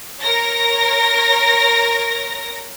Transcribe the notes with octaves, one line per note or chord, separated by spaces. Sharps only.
A#4 C#5 A#6